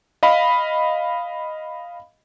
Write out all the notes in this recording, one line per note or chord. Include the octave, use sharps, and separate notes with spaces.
D#5 F5 B5